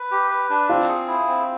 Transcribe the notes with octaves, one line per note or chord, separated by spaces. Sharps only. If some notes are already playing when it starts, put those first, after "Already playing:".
Already playing: B4
G4
B4
D4
C4 F4
G#4
E4
C4